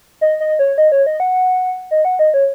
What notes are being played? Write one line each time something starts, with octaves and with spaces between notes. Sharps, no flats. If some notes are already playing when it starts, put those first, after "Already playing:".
D#5
D#5
C#5
D#5
C#5
D#5
F#5
D#5
F#5
D#5
C#5